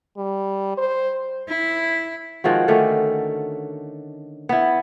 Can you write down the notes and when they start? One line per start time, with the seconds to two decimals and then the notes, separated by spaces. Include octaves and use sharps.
0.17 G3
0.78 C5
1.49 E4
2.44 D#3 F3 G#3 F#4
2.68 D3 D#3 A3 C#4
4.49 B3 E4